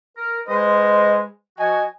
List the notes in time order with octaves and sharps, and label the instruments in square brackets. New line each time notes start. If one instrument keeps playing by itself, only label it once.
[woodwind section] A#4
[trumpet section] G#3 B4 C5 [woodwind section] D#5
[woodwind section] F3 F#4 [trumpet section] D#5 G#5